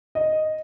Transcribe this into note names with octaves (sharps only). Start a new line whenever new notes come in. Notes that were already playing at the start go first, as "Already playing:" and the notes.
D#5